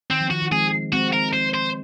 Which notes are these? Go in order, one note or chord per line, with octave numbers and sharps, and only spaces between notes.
D#3 C4
F3
D#3 F#4
D#3
G#3 C4 G#4
G#3 C4 F#4
A#4
C5
C5